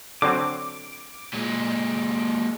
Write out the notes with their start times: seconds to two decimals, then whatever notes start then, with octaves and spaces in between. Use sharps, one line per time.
0.22 D3 F#3 C4 D6
1.33 A#2 G#3